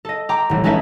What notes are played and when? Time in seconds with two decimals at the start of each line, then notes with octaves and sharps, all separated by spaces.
0.05 A4 D#5
0.29 G5 A#5 C6 D6
0.49 D#1 A1
0.64 G#3 C#4 D#4 A4 B4 E5